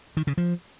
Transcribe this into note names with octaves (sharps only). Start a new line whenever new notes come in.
D#3
C#3
F3